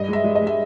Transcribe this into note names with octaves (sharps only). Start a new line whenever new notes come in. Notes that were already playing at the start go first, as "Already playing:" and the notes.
Already playing: G2 D#5
G#3 E5
G#3
D#5
G#3
E5